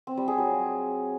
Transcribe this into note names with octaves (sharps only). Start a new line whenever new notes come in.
C4
G3
G#4
F#3